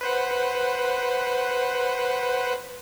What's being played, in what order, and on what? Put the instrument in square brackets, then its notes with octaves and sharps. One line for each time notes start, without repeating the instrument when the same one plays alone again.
[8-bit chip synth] B4 C5 F#5